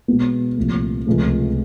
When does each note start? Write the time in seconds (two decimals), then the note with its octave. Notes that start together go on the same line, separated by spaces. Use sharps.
0.08 B2 G#3 B3
0.57 C2 A#2 F3 A3
1.07 C#2 C3 F3 A3